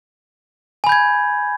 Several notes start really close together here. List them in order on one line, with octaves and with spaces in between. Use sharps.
G#5 B5 G6 G#6